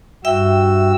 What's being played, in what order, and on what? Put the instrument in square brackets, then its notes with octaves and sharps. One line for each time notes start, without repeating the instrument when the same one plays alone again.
[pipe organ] G2 F#4 E6 [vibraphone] E5 G5